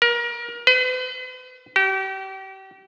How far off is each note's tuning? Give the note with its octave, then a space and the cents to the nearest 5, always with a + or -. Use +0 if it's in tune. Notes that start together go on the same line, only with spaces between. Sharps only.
A#4 +30
B4 +45
G4 -35